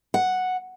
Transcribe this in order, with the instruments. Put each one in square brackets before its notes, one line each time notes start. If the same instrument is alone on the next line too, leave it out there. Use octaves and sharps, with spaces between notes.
[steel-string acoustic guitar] F#5